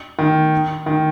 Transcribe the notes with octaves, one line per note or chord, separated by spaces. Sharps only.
D#3
D#3